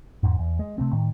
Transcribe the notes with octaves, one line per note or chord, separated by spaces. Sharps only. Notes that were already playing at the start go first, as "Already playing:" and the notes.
E2 G#2
E2
G#3
C3 A3 C4
A2 D#3